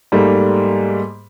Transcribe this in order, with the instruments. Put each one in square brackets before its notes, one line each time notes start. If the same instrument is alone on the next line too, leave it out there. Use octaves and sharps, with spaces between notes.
[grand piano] G#2 G3 A3 A#3